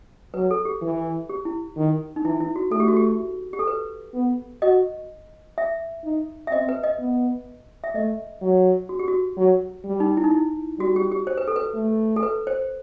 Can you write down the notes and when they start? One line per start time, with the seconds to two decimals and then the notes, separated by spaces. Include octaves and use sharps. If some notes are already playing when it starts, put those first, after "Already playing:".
0.34 F#3 B4
0.51 A4
0.65 G4
0.82 E3
1.29 G4
1.45 E4
1.77 D#3
2.16 D#4
2.25 E3 E4
2.40 E4
2.56 F#4
2.71 A3 A4
2.80 G4
2.88 F#4
2.96 G4
3.53 G4
3.59 A4
3.67 B4
4.14 B3
4.62 F#4 D#5
5.58 E5
6.05 D#4
6.47 E5
6.52 C4 D#5
6.69 B4
6.83 D#5
6.99 B3
7.84 E5
7.95 A3 D#5
8.42 F#3
8.89 F#4
8.99 G4
9.08 F#4
9.37 F#3
9.85 G3
10.00 D#4
10.17 E4
10.24 D#4
10.31 E4
10.79 G3 F#4
10.96 G4
11.12 G4
11.27 C5
11.37 B4
11.47 A4
11.56 B4
11.75 A3
12.16 A4
12.23 B4
12.47 C5